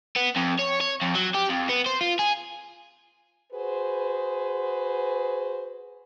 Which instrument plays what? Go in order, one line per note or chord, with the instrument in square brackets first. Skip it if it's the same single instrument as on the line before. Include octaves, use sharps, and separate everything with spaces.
[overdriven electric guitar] B3
F2
C#5
C#5
F2
F#3
G4
F2
B3
C5
F4
G#4
[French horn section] F#4 G#4 B4 C5